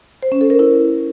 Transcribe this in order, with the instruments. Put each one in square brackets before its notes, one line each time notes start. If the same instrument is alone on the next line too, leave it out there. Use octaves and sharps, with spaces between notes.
[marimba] C5
C#4
A4
A#4
E4